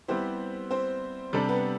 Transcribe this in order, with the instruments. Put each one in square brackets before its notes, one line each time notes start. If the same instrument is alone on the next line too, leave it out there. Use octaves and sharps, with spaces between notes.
[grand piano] G3 B3 E4 G4 [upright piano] C4 C5
[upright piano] C4 C5
[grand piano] C3 G3 D4 A4
[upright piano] B3 B4